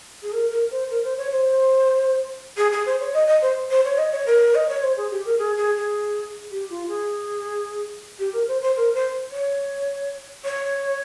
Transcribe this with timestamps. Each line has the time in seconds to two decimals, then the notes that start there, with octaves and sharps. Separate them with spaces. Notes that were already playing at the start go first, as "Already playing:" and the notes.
0.23 G#4
0.32 A#4
0.51 A#4
0.71 C5
0.90 A#4
1.04 C5
1.17 C#5
1.32 C5
2.57 G#4
2.72 G#4
2.86 C5
3.00 C#5
3.14 D#5
3.27 D#5
3.42 C5
3.71 C5
3.85 C#5
3.98 D#5
4.13 C#5
4.26 A#4
4.55 D#5
4.69 C#5
4.83 C5
4.97 G#4
5.11 G4
5.25 A#4
5.39 G#4
5.57 G#4
5.76 G#4
6.51 G4
6.70 F4
6.88 G#4
8.19 G4
8.33 A#4
8.48 C5
8.62 C5
8.76 A#4
8.94 C5
9.32 C#5
10.45 C#5